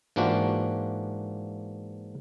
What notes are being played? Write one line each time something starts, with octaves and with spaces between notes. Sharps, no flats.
G#2 E3 A#3 D4 F4 F#4